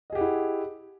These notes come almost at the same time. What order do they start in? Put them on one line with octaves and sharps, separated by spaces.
D#5 G#4 G4 F#5 E4